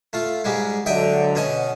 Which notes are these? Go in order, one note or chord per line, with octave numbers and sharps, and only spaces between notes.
A3 F4
G#2 G3 G#3
D3 F#3 D#5 E5 G5
B2 C#4 D#5